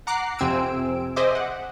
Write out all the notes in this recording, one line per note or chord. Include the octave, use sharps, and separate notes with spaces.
F#5 A#5 D6 F#6 C7
F2 C3 C4 G#5 E6 D7
G#4 C5 D#5 E5 D6
F#5